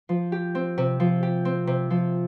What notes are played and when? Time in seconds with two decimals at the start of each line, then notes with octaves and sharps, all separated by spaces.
0.09 F3
0.32 G4
0.55 C4
0.78 C3
1.00 F3
1.23 G4
1.45 C4
1.67 C3
1.90 F3